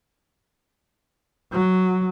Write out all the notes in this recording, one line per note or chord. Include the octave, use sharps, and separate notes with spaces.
F#3